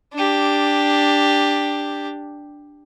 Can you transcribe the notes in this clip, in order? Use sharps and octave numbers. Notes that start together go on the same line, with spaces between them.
D4 G4